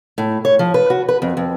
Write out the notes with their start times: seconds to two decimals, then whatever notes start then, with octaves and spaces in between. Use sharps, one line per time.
0.18 A2
0.45 C#5
0.59 F3
0.74 B4
0.90 F#4
1.09 B4
1.22 F2
1.37 F2